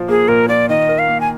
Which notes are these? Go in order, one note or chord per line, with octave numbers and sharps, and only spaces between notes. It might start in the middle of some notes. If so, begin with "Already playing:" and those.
Already playing: A#2 F3 F4
A#3 G#4
A#2 A#4
F4 D5
D#3 D#5
A#4
F5
A#3
G#5